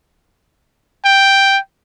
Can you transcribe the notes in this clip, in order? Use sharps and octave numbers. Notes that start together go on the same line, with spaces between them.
G5